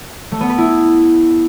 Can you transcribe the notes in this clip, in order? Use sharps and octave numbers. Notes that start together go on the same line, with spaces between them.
A3
B3
B4
E4